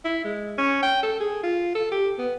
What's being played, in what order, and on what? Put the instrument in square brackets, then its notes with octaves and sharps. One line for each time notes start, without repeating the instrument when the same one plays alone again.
[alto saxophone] E4
G#3
C#4
G5
A4
G#4
F4
A4
G4
B3